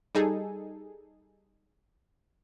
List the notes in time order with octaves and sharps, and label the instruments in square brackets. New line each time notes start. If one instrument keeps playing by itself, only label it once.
[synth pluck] G3 D#4 G#4 A4